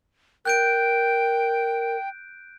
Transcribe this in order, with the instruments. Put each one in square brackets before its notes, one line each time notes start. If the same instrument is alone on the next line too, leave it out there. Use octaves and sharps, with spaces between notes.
[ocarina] A#4 [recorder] G5 [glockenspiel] F#6 G6 D7